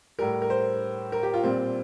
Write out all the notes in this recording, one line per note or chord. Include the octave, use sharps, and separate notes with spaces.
A2 G3 A#4
A#4
C5
A#4
G4
F4
A#2 G3 C4